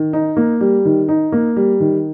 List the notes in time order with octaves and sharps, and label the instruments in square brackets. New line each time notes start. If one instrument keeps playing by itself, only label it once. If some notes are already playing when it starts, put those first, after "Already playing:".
Already playing: [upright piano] D#3
D#4
A#3
G3
D#3
D#4
A#3
G3
D#3